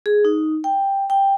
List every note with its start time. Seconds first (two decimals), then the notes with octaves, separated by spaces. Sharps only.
0.06 G#4
0.25 D#4
0.64 G5
1.10 G5